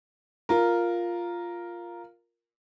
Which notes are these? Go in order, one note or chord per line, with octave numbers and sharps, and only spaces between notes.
F4 A#4